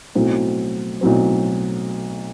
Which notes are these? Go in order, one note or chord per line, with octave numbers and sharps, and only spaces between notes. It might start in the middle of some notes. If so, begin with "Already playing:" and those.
B1 A2 F#3 C4
B1 A2 F#3 C4